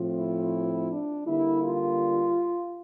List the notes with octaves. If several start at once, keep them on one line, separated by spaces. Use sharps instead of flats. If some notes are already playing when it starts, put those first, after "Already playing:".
Already playing: A2 F3 C4
E4
D4
D3 G3 A#3 E4
F4